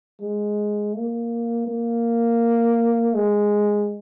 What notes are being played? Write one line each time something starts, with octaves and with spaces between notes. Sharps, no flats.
G#3
A#3
A#3
G#3